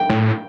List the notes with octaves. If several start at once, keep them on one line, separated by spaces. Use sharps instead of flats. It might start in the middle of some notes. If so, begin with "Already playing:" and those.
Already playing: G5
A2